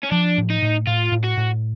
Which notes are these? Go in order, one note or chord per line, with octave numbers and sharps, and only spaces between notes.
C#4
F3 D4
A2
D#4
A2
A2 F4
A2
F#4
A2